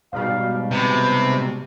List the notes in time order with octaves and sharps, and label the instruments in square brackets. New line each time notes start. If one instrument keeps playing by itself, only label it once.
[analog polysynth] G#2 B2 G3 [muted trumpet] F5
[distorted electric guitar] C3 [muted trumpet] B4